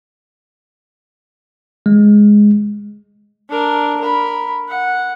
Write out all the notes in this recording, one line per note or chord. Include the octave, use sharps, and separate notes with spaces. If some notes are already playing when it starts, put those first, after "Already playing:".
G#3
D4 A#4
A#4 B5
F#5